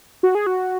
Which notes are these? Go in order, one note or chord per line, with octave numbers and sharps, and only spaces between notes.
F#4
G#4
F#4